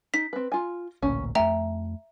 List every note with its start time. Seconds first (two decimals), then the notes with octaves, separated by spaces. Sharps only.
0.14 D#4 B6
0.33 C4 B4
0.52 F4 G#5
1.02 A1 D2 A#2 C#4
1.35 F2 A3 E5 G5 A#5